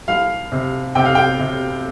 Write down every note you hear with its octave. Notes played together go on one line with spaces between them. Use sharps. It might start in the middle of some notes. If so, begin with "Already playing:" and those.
C2 F5
C3
C3 G5
F5
G5
C3